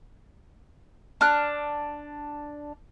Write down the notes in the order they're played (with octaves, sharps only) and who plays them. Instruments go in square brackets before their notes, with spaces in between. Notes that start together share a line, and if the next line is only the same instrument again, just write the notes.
[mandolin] D4 F6 F#6